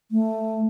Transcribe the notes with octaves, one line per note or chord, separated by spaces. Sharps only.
A3